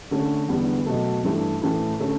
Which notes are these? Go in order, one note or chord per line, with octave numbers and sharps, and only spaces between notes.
D3 A3 C#4
E2 D3 G3 B3
B2 F#3 A3
G2 E3 A3 E4
A2 E3 A3 E4
D3 A3 C#4